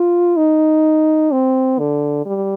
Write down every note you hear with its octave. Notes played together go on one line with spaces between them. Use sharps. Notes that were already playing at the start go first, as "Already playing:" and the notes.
Already playing: F4
D#4
C4
D3
G3